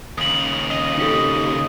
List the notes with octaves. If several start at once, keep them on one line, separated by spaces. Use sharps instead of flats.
D#2 C#3 D#6 F#7
D#5
D#4 G4 A4